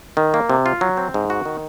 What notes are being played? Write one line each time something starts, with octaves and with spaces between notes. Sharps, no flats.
D#3
A#3
C3
F4
F#3
C4
G#2
F#4
D#3